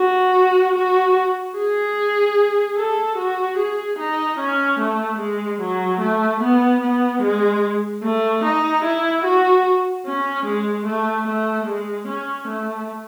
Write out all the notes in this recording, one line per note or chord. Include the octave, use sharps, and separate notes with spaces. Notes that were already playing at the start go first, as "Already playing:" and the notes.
Already playing: F#4
F#4
G#4
A4
F#4
G#4
D#4
C#4
A3
G#3
F#3
A3
B3
B3
G#3
A3
D#4
E4
F#4
C#4
G#3
A3
A3
G#3
C#4
A3